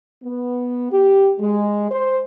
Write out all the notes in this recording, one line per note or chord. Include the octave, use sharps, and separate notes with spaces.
B3
G4
G#3
C5